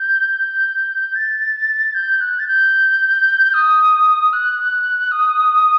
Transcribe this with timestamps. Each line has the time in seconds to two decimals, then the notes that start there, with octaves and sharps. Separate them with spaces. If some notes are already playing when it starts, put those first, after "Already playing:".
Already playing: G6
1.15 A6
1.94 G6
2.20 F#6
2.39 A6
2.48 G6
3.54 D#6
4.33 F#6
5.12 D#6